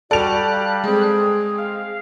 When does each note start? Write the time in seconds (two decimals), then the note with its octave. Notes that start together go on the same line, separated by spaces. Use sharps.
0.11 G3 F#4 A4 D5 F#6 D7 F7
0.51 F5
0.84 G#3 C4 G#4
1.58 F5